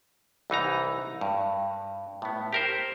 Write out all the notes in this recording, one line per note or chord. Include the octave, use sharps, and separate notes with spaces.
C2 E3 D#4 A#5
G2
A2 B3
G4 A#4 C5